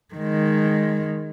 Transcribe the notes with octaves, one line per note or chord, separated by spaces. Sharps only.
D#3 G#3